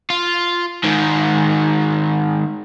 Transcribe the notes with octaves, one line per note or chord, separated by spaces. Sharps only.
F4
G#2 D#3